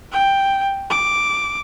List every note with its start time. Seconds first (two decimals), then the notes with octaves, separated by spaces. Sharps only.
0.12 G5
0.90 D6